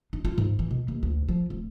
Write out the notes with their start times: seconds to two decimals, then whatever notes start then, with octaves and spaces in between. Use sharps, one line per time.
0.13 D#4
0.25 F4
0.38 G#2
0.59 E3
0.71 B2
0.88 D#2
1.03 D2
1.29 F3
1.50 D1